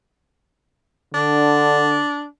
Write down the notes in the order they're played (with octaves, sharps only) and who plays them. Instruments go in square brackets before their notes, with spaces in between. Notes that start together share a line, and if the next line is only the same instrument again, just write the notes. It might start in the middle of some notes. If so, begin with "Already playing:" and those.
[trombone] D3 [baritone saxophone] D4